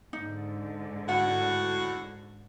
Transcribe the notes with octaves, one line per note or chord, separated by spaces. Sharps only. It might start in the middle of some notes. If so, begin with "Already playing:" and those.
G#2 D3 D#4
A2 F#4 F#5